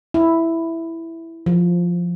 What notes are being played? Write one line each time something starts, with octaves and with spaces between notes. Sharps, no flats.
E4
F3